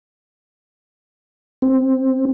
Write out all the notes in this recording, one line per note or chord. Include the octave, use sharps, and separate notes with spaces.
C4